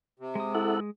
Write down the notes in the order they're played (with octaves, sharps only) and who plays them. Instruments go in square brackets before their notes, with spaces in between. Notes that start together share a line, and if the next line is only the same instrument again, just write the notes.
[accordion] C3
[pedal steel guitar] G#3 D#6
[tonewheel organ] E4 A4 F#5